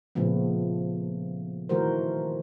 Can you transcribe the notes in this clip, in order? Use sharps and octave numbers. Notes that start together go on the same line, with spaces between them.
A#2 C#3 F3 A3 B3
D#3 E3 A3 F#4 A#4 C5